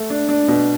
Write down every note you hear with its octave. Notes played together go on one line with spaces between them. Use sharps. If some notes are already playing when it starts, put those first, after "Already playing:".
Already playing: A3
D4
D4
B2